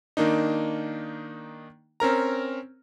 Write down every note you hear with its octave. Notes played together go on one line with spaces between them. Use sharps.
D#3 A#3 D4 D#4
C4 C#4 A#4 A#5